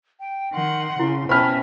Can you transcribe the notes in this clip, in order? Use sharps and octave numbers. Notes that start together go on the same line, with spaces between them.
G5
D#3 F#5 C6
C#3 E4
B2 C#4 C5 E5 G5 A5 B5 F6